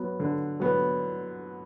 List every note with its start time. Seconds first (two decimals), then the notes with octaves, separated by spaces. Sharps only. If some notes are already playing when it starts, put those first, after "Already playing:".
Already playing: F#3 B3
0.20 D3
0.60 F#3 B3